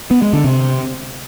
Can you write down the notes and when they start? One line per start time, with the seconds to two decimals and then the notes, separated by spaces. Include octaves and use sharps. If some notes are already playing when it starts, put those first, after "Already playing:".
0.11 B3
0.22 G#3
0.33 D3
0.44 C3